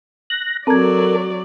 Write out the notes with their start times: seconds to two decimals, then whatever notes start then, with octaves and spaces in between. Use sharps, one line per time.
0.30 F#6 A#6
0.67 F#3 C4 A4 A#4 D5 G#6